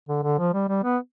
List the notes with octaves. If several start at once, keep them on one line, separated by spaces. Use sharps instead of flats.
D3
D3
F3
G3
G3
B3